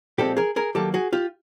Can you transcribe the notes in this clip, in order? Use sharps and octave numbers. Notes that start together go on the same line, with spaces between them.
A#2 F3 G#3 C4 G4 A4
G#4 A#4
G#4 A#4
D#3 F#3 A#3 G4 A4
F#4 G#4
F4 G4